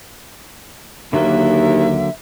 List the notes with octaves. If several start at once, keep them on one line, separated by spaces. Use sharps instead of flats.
D#2 D3 F#3 A#3 E5